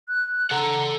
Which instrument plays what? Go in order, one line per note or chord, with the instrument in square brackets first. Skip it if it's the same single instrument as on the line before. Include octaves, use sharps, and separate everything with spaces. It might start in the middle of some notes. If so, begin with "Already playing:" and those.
[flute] F#6
[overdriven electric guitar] A4 F#5 [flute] A#5